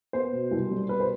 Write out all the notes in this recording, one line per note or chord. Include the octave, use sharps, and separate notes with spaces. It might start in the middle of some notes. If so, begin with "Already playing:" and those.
B3 C5
B2
C2
G3
B2 B4
C5